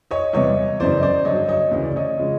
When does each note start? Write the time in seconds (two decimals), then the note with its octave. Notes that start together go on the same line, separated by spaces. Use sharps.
0.11 C#5 D#5
0.33 E2 C3 E3 G3 C#5 D#5
0.80 F#2 C#3 E3 C5 D5
0.98 D#5
1.03 C5 D5
1.25 G2 D3 F#3 C#5 D#5
1.48 C#5 D#5
1.71 D2 C#3 E3 D#5
1.83 D5
1.96 C#5 D#5
2.17 C#3 F3 G#3